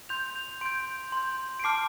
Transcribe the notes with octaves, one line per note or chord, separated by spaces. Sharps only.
C6 G6 F7
F7
C6 G6 D7
C6 G6
D7
A5 D6 F6 C7